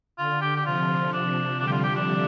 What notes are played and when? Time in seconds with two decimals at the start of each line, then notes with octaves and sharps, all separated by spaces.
0.18 D3 F4
0.41 G4
0.56 G4
0.65 C3 F3 F4
1.13 D4
1.59 D3 G3 D4
1.67 G4
1.71 F4
1.83 G4
1.96 D4